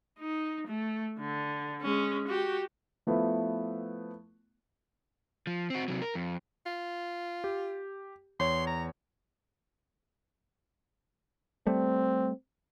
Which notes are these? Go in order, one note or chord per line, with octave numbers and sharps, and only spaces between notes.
D#4
A3
D3
G#3 C#4
F#4 G4
F3 A3 B3 E4
F3
C4 F#4
C3 F#3
A#4
F2
F4
G4
E2 C#5 C6
A#5
G3 A3 C4